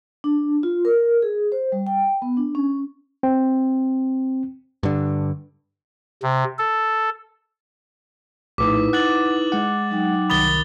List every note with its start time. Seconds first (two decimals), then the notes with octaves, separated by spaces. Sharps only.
0.24 D4
0.63 F4
0.85 A#4
1.22 G#4
1.52 C5
1.72 G3
1.87 G5
2.22 B3
2.37 D4
2.55 C#4
3.23 C4
4.83 G2 D3
6.23 C3
6.59 A4
8.58 A#1 A2 D#4 E4 B4 D6
8.93 F#5 F#6 A6 F#7
9.52 G#3 F#5
9.90 F#3 D#4 G5
10.30 C2 D#3 B5 D#6 A6 G7